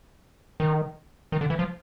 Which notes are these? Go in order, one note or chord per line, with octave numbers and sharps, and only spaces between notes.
D#3
D#3
D3
E3
F3